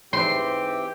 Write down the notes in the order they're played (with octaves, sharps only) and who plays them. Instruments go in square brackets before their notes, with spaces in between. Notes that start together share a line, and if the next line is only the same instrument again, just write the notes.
[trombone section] G#2 E3 [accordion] C4 G4 G5 [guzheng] C6